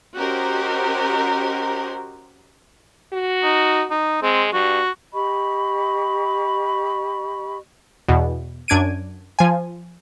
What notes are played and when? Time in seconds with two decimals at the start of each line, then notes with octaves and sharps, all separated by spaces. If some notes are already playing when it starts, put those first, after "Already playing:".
0.17 C#4 F#4 G4 A#4 C5 D#5
3.13 F#4
3.43 D#4
3.90 D#4
4.22 G#3 C4
4.53 G2 F#4
5.14 G4 D#5 B5 C#6
8.08 E2 B2
8.68 F#2 D4 G#6 D7 D#7
9.39 F3 G#5